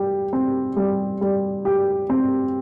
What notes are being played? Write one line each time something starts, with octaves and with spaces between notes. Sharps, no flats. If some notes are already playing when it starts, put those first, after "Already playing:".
Already playing: G3 G4
C4
G3
G3
G4
C4